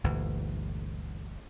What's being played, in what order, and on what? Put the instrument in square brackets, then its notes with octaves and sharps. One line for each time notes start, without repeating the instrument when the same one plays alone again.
[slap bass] G1 D2 A#2 E3